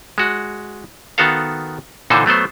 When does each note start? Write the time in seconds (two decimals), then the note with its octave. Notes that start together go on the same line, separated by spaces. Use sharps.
0.18 G#3 F#4
1.18 D#3 B3 F#4 A4 F5
2.10 A#2 D3 E3 D#4 A4 C5
2.26 F#3 A3 B3 C5